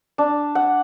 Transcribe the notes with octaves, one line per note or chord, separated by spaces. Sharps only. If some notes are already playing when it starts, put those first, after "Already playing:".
D4
F#5